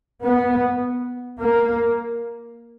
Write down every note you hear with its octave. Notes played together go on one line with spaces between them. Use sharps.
B3
A#3